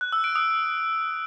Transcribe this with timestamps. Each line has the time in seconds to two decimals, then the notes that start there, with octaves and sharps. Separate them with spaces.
0.01 F#6
0.12 E6
0.24 D7
0.35 D#6